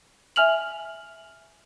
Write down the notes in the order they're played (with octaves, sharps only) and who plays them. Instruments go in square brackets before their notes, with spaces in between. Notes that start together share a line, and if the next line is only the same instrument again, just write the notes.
[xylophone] E5 G#5 F6 F7 F#7